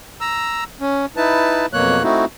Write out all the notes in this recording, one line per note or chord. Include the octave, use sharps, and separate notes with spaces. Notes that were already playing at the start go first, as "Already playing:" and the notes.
A#5 E6
C#4
D#4 E4 B4 A5
F2 B2 F#3 A#3 C#5 F#6
A3 C4 D#4 E4 F#4